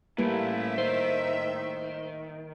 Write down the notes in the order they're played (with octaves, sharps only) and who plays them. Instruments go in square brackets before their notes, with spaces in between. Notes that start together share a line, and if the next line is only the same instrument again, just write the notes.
[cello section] A2 E5 [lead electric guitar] E3 A3 [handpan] G3 A#3 B4
[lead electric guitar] D#3 [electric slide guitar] C5